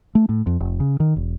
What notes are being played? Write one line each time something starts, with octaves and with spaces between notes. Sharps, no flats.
A3
A2
F2
F1
C#3
D#3
E1